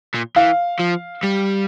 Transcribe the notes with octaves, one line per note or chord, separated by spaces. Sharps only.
A#2
E3 F5
F3
G3